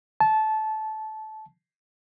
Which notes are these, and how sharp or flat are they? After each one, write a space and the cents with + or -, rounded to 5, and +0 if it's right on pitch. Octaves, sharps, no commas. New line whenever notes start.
A5 -20